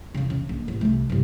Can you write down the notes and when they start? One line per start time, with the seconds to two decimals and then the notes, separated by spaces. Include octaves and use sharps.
0.14 E2 C#3
0.30 C#3
0.49 A#1
0.68 A1
0.81 C2 A3
1.10 G1 C2